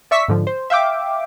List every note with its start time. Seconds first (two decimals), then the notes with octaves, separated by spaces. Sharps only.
0.11 D5 E5 C#6 E6 B6
0.28 G#2 D3 F3
0.47 C5
0.70 E5 F5 G5 D6